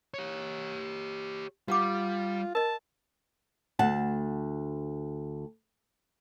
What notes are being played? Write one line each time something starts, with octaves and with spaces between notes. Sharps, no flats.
G4 C#5
G3 F4 G4 F#5 D6
A#4 D#5 A5
D2 F#5 A5